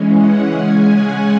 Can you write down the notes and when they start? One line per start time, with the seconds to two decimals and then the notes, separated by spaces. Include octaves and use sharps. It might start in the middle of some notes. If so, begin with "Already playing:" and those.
Already playing: E3 G#3 C#4
0.13 F#5
0.49 C#3 G#3 C#4 G#5
0.87 F#5